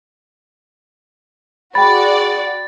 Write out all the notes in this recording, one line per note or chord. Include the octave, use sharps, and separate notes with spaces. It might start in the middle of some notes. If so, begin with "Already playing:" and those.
F#4 G#4 D5 G5 B5 A6